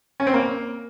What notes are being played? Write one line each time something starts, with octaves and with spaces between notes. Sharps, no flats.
C#4
C4
A#3